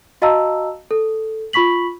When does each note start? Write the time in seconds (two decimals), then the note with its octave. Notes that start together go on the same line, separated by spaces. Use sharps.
0.22 F#4 D#5 F5 A5 A#5 E6
0.91 A4
1.53 F4 B5 C#6 B6 F#7